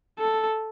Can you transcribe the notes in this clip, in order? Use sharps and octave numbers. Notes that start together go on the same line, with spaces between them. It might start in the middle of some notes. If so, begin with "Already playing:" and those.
A4